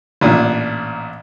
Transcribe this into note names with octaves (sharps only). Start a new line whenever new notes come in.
A1 A#2 D4